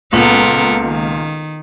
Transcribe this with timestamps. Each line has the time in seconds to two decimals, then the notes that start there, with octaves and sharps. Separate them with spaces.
0.13 C#2 A#2 B3 A4 A#4 F#7
0.86 D#3